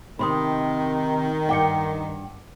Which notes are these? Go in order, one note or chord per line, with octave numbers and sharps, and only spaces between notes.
C3 D#3 B5 C6 D#6
G2 F#5 G5 D6 C#7